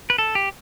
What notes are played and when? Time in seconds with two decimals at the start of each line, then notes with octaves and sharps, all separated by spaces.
0.10 B4
0.18 A4
0.35 G4